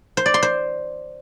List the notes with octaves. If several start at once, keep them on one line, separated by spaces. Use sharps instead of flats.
C5
D5
C6
C5